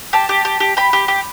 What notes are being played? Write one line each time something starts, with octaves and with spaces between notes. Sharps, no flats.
G4 A5
G4
G4
G4
G4 B5
G4
G4